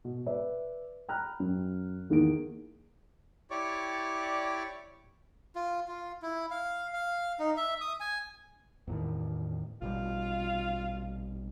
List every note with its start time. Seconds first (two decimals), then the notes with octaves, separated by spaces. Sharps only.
0.04 B2
0.26 B4 D5 E5
1.09 G5 A#5 B5 F6 F#6
1.40 F#2
2.10 E2 D#3 A#3 G#4 D7
3.51 E4 G4 C#5 D5 C#6 D6
5.56 F4
5.88 F4
6.22 E4
6.51 F5
6.93 F5
7.39 D#4
7.57 E5
7.81 D#6
8.00 G#5
8.87 E2 A2 D#3
9.82 A#1 B2 G3 F4